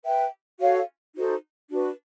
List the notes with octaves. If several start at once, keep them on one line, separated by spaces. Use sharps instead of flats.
B4 E5 G5
F#4 A4 C#5 F5
D#4 F#4 A4 C5
D4 F#4 B4